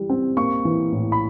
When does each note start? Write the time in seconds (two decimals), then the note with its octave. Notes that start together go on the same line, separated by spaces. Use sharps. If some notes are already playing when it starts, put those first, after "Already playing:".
Already playing: E3 G3
0.10 C4
0.37 A#3 C#6
0.65 E3
0.92 A2
1.12 B5